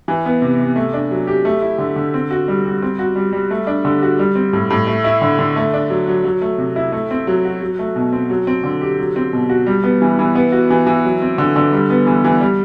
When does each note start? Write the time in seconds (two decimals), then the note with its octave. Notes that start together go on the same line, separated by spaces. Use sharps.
0.08 E3
0.26 B3
0.42 C3
0.59 C3
0.76 A3
0.94 D4
1.11 F#3
1.27 G4
1.45 A3
1.62 E4
1.79 D3
1.96 D3
2.14 C4
2.31 F#4
2.48 G3
2.65 G3
2.82 C4
2.99 F#4
3.16 G3
3.33 G3
3.51 A3
3.67 D4
3.85 D3
4.02 F#4
4.19 G3
4.35 C4
4.53 A2
4.70 A2
4.87 A3
5.04 E4
5.22 D3
5.39 D3
5.56 A3
5.74 D4
5.90 F#3
6.08 F#3
6.24 F#3
6.41 A3
6.58 C3
6.76 E4
6.92 A3
7.11 C4
7.27 F#3
7.45 F#4
7.62 F#3
7.79 A3
7.96 B2
8.13 C4
8.30 F#3
8.47 C4
8.64 D3
8.81 G4
8.99 F#3
9.16 C4
9.33 B2
9.49 F#4
9.66 G3
9.84 B3
10.02 E3
10.19 E3
10.35 B3
10.52 F#4
10.70 E3
10.87 E3
11.05 F#3
11.22 C4
11.38 D3
11.56 D3
11.73 G3
11.90 B3
12.06 E3
12.24 E3
12.40 G3